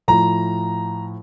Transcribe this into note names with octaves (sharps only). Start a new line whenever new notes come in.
A2 F3 A#5